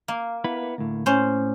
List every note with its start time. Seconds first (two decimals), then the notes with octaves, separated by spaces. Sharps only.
0.08 A#3
0.44 B3 E4 B4
0.78 D2 A2
1.06 A2 C#4 C5